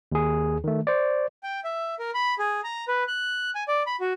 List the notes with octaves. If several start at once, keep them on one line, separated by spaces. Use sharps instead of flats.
D#2 G#4
D#3 A3
C5 D5
G5
E5
A#4
B5
G#4
A#5
B4
F#6
G#5
D5
B5
F#4